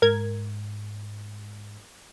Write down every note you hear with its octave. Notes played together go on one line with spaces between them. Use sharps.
G#2 A#4 G#6